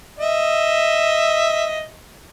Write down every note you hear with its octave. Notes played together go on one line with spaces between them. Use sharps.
D#5 E5